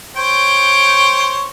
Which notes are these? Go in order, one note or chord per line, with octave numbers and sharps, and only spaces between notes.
C5 C#5 G5